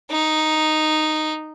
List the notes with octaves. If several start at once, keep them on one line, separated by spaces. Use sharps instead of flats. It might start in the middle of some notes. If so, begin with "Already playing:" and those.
D#4